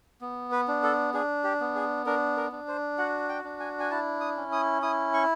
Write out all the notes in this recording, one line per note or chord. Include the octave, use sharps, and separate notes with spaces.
B3
B4
D4
A4
D4 G#4
G4
B3
G#4
D4 A#4
A#4
D4
C5
F#4 F#5
G5
D4
G#5
G#5
E4 A5
D#6
C#4
D#6
E4 D#6
C#6